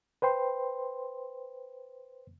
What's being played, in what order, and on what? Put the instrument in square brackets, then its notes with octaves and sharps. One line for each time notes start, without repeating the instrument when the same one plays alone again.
[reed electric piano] B4 C5 G5 C6